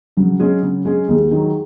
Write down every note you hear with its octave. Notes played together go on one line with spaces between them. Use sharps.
C#3 F#3
G#3 C#4 G#4
C#3
G#3 C#4 G#4
D#2 G#3
D#3 F#3